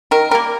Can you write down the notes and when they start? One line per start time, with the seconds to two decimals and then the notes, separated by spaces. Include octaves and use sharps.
0.11 D#3 A#4
0.31 G3 A#3 A#4